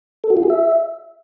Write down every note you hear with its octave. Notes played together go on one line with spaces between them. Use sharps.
A4
F#4
F4
G#4
E5